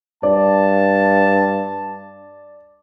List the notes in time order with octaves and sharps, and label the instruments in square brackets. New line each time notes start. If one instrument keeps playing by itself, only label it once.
[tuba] G2 [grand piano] D5 [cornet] A5